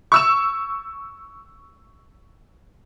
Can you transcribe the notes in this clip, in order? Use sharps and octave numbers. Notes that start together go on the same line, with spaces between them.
C#6 E6 E7